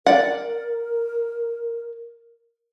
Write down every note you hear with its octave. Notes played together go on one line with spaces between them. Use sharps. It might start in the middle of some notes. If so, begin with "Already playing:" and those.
A#4 D5 F#5